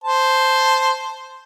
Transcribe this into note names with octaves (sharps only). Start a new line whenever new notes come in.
C5 A5